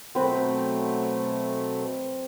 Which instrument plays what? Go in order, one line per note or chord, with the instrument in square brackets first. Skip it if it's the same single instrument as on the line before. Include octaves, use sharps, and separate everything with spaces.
[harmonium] B2 F#3 A3 [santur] C4 B4